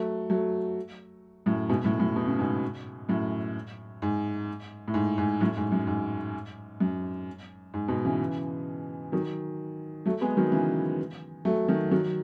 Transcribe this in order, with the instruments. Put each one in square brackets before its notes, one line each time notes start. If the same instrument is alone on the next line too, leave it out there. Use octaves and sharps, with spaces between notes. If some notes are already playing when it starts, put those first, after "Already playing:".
Already playing: [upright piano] F#3 A3
F#3 A3
F#2 A2
G#2 B2
F#2 A2
F#2 A2
B2
C#3
G#2 B2
F#2 A2
G#2
A2
G#2
G#2
F#2 A2
G#2
F#2
G#2
F#2
G#2
G#2 B2
C#3 E3
D#3 F#3
F#3 A3
G#3 B3
D#3 F#3
C#3 E3
F#3 A3
D#3 F#3
D#3 F#3